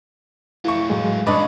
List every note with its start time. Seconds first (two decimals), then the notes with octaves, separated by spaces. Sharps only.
0.65 E3 A3 F4 C#6
0.90 A2 F#3 G#3
1.27 G2 C#4 D4 A4 B4 D5 D#5 C#6